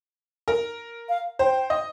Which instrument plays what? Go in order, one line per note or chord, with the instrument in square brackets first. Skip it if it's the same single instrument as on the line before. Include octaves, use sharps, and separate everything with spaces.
[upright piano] A#4
[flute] F5
[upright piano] C5 [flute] G5
[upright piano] D#5